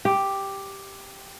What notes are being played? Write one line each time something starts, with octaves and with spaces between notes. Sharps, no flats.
G4